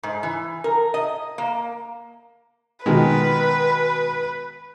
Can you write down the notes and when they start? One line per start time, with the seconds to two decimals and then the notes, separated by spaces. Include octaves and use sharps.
0.03 G#2
0.23 E3
0.64 A#4
0.94 D#5
1.38 A#3
2.86 B2 D#3 G#3 B4